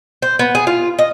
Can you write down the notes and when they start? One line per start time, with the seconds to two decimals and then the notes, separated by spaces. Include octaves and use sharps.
0.22 C5
0.39 B3
0.55 G#4
0.67 F4
0.99 D#5